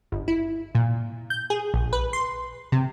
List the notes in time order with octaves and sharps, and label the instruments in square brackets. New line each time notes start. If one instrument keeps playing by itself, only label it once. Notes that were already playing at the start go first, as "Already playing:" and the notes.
[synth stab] G1
E4
A#2
G6
G#4
A#1
B4
C6
C3